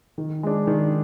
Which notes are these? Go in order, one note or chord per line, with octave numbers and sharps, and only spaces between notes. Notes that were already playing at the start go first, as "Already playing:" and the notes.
D#3
G#3 D4
D#3